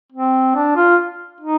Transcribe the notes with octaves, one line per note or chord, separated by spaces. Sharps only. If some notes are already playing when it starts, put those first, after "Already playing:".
C4
D4
F4
D#4